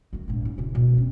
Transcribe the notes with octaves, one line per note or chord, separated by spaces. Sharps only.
D#3 A#3
A#1 G#2
E4
C#3 E4
D2 B2
C4 C#4